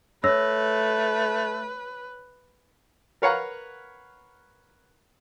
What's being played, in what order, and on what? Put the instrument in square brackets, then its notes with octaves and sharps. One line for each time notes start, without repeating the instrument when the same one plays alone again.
[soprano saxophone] A3 [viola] B4 [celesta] C#5 E6 A#6
[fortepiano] A#4 B4 C#5 F5 F#5 A#5